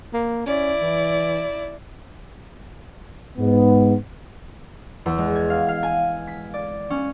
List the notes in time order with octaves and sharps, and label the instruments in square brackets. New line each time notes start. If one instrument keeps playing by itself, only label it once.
[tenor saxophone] A#3
[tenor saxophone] C#4 [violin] E4 D5
[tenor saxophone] E3
[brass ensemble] G#2 B3
[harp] E2
G#3
G#6
F5
F5
G#5
B6
D5
C#4